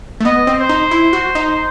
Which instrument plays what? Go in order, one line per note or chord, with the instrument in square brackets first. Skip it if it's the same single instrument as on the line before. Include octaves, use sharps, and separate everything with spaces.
[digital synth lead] A3
[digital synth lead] B3 [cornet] D#5
[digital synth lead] C4
[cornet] C5
[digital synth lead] D#4
E4
F#4
D#4